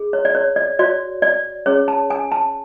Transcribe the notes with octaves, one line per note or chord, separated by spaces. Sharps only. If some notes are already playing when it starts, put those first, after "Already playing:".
Already playing: G#4
C#5
D5
C#5
D5
F#4 C#5 D5
D5
C#4 G#4 C#5
A5
G#5
A5